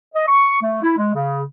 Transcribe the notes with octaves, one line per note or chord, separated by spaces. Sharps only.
D#5
C#6
A3
E4
G#3
C#3